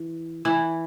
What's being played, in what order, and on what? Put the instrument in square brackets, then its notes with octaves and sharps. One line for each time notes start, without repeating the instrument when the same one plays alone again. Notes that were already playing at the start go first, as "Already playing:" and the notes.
Already playing: [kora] E3
E3 E4